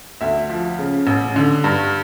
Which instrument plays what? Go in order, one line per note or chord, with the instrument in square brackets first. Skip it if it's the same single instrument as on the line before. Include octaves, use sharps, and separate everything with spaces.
[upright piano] D2 E5
F3
C#3
A1
D3
G2